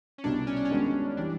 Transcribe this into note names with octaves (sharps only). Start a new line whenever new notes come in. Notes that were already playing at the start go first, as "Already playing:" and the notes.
C#4
C2 B2 G3 B3 D4
C#4
D4
C#4
D#3 G#3 B3 D4 F#4
E3 G3 D4